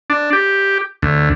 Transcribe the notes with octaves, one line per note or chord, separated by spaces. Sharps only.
D4
G4
D2